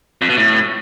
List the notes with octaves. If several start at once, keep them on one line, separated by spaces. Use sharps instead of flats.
F2
B2
A2